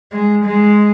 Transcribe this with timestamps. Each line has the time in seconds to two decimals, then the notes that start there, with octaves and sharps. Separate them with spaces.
0.12 G#3
0.44 G#3